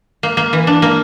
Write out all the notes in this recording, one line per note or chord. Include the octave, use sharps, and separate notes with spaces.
A#3
A#3
E3
D4
A#3